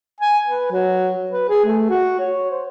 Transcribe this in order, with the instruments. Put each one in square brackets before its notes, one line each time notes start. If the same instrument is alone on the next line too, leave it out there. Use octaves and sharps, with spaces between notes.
[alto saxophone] G#5
B4
F#3
B4
G#4
A3
F#4
C#5
C5